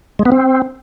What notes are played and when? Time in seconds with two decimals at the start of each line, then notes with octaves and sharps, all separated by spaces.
0.19 G#3
0.25 B3
0.32 C4